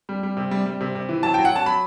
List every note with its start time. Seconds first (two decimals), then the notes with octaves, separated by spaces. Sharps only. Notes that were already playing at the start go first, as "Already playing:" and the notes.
0.09 G3
0.23 G3
0.37 C3
0.51 G3
0.66 G3
0.81 C3
0.95 C3
1.09 E3
1.23 F#3 A5
1.34 F#3 G5
1.45 F#5
1.52 F#3 A5
1.66 F#3 B5